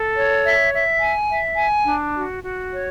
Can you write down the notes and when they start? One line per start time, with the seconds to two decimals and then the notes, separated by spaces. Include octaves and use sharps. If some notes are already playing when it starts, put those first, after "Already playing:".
Already playing: A4
0.15 C#5
0.43 E5
0.72 E5
1.00 G#5
1.29 E5
1.57 G#5
1.86 D4
2.15 F#4
2.42 F#4
2.72 C#5